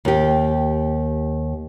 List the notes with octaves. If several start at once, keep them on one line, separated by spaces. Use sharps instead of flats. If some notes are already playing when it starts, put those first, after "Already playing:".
D#2 G4